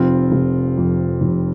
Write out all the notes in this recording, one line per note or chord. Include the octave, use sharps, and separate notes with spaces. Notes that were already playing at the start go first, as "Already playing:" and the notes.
Already playing: F1 C4 F4
F1
F2
F1